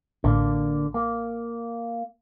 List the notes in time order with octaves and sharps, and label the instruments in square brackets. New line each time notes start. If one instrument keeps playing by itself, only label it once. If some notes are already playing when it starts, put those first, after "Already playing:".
[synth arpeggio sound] A1 A2 [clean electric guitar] D3 A#3
[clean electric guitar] A#3